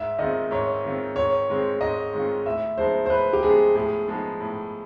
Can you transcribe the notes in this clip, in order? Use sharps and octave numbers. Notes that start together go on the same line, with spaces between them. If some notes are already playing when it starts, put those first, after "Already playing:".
Already playing: G#2 E5
D#3 G#3 C4 F4 D#5
G#2 C#5
D#3 G#3 C4 F4
G#2 C#5
D#3 G#3 C4 F4
G#2 D#5
D#3 G#3 C4 F4
A2 E5
F3 G#3 B3 D#4 C5
C5
A2 B4
G4
F3 G#3 B3 D#4 G#4
A2 G#4
F3 G#3 B3 D#4
A2